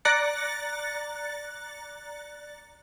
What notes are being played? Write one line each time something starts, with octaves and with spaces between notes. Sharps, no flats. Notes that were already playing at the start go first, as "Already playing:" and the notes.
D5 A#5 F#6 A6 C#7